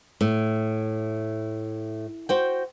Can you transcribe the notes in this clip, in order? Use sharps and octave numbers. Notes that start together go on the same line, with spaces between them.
A2
F#4 C5 G5